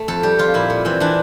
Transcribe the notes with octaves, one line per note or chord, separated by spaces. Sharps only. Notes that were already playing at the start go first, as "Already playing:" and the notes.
Already playing: A3
F2 A4
G3 G4
F2 F4
A#2 E4
A#2
E3 C4
E3 D4